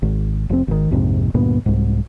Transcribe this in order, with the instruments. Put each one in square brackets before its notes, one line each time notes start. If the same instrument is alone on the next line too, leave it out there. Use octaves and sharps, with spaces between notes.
[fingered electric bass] G#1
F1 C4
G#1 D#3
A#1 F2 G#2 C3
D2 G2 A#2 B3
C2 G#2